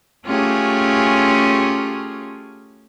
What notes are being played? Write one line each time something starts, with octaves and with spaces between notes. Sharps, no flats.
A3 C#4 F4 G4 G#4